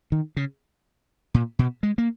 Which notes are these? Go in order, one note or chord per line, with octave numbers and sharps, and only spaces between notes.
D#3
C#3
A#2
B2
G#3
A#3